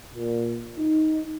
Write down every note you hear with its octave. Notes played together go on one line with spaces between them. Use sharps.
A#2
D#4